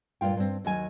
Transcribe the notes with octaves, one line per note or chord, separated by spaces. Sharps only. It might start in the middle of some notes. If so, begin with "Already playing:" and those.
G2 A#2 F4 G5
G2 C4
D#2 F#3 G#5